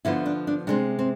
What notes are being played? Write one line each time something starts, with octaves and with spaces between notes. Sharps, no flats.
D3 F3 B3 E4
D4
D4
C3 G#3 C4 D4
C4